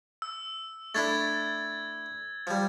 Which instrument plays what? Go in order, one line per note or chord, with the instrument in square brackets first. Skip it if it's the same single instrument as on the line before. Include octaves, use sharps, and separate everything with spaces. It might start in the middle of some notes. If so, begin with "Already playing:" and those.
[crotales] E6
[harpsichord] A3 D4 E4 [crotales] G#6 A6
[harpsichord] F3 G3